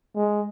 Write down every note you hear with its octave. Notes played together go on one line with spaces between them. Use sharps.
G#3